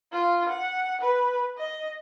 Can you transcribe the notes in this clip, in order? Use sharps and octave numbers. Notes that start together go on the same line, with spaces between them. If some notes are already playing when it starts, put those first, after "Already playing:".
F4
F#5
B4
D#5